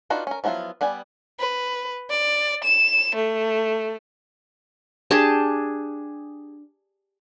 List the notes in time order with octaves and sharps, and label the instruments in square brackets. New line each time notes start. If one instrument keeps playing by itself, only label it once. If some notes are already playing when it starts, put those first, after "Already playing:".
[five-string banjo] D4 D#4 F4 F#4 B4
C#4 A#4
F3 F#3 B3 E4 F4
G3 B3 D5 G#5
[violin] B4
D5
E7
A3
[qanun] D4 G4 G#4 A5